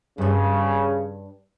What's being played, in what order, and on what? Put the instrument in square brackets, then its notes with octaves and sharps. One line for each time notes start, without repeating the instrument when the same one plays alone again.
[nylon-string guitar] G2 G3 [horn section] C#3